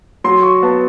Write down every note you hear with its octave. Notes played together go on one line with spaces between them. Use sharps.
F#3 C6
C#6
B3 A5